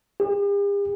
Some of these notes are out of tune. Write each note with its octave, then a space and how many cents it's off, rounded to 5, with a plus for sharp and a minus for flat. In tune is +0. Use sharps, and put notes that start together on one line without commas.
G4 +45